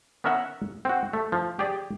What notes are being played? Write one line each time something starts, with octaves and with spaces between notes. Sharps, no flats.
B3 C#4 A#4 E5 F#5
C4 F#4
A3
F3
G4 G#4 D5